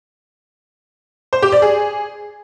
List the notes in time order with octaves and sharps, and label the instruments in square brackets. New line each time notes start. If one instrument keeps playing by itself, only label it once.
[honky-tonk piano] C5
G4
D5
G#4